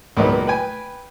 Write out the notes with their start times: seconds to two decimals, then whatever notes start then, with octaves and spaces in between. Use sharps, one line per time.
0.17 C#2 A#2 F#3 B3 D#4
0.47 B4 G5 G#5